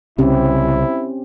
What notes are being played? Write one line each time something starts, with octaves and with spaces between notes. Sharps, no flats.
C2 C#3 C4 C#4 E4 G4